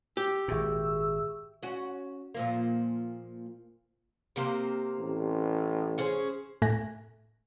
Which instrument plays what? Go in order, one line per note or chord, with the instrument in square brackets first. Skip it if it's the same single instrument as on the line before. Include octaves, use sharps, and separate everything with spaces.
[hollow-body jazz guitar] G4 [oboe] E6
[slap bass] G#1 A#2 [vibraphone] G#4 E5 C#6
[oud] C#4 F#4
A#2 F3 A#3
[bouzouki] C3 A#3 C5
[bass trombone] A1
[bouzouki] C#4 G#4 C5
[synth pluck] A2 A3 G#5 F#6 A#6